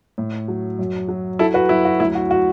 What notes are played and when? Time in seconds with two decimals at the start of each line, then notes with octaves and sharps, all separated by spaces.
0.18 A2
0.48 F#3
0.79 F#2
1.08 F#3
1.39 F#3 E4 A4
1.54 F#4 B4
1.69 F#2 E4
1.85 F#4
2.00 D2 E4
2.15 F#4
2.31 F#4